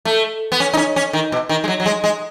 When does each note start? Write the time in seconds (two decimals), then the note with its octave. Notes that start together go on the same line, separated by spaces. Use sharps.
0.05 A3
0.52 B3
0.60 C#4
0.73 D#4
0.77 C#4
0.96 C#4
1.13 D#3
1.32 B2
1.49 D#3
1.64 G#3
1.68 F#3
1.80 F#3
1.86 G#3
2.04 G#3